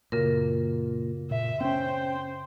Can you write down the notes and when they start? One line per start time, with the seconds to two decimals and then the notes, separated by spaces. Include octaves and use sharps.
0.12 F#2 A#2 C#3 A#4
1.31 A#2 E5
1.61 C4 C#4 C5 G5